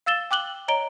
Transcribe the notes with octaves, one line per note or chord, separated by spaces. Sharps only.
F5 E6 A6 E7 G7
G5 D6 F#6 F#7 G7
C#5 D#5 A#5 D7 G7